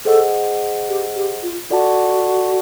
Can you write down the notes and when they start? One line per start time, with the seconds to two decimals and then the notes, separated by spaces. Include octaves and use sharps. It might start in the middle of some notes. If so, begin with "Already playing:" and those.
0.05 G#4 A4 C5 D#5 F#5
0.89 G4
1.16 G4
1.43 F4
1.70 F4 F#4 A4 D5 F#5 A5